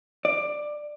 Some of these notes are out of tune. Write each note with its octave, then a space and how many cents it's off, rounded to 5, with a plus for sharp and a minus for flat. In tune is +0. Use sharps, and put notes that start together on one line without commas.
D5 +15